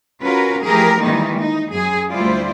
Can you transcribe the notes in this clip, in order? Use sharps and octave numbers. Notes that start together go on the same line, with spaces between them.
C#4 F4 F#4 A#4 B4
E3 F3 A3 G4 G#4 A#4
D#3 E3 G3 G#3 A#3 D#4
D#4
F#2 G#4
D2 G3 E4 F4 C5 D5